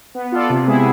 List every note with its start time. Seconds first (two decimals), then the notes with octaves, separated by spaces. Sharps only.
0.15 B3
0.32 F4 A4 D5
0.50 C3
0.68 G#3 B3 E4 G#4